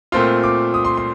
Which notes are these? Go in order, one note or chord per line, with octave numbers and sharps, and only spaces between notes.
A#2 A3 C4 F4 C6
D6
D#6
C6
C6